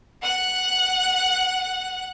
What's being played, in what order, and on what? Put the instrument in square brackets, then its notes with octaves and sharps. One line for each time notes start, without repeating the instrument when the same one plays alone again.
[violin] F#5 F#6